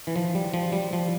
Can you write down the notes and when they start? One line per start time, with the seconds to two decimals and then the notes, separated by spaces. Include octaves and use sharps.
0.07 E3
0.16 F3
0.35 G3
0.54 F3
0.73 G3
0.93 F3